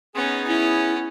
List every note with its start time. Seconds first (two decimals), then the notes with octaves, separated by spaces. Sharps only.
0.15 B3 C#4 D#4 G#4
0.47 C#4 E4